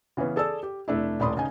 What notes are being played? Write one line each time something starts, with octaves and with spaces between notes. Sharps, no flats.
C#3 E3 B3 C#4
G#4 A4 D5 E6
G4
F1 A3 D4 E4
D#1 A2 D5 B5 C6 D#6
C#3 D#4 G#5